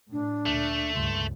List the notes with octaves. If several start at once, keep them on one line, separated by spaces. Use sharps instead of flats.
A2 D4
D2 A#2 A3
C#2 G2 C6